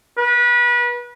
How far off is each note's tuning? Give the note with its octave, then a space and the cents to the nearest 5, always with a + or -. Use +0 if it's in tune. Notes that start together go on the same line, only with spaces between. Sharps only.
B4 -30